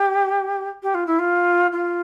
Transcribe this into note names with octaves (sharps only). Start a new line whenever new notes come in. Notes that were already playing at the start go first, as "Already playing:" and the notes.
Already playing: G4
G4
F4
E4
F4
F4